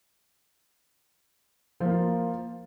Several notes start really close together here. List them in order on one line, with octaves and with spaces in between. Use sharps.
F3 A#3 F4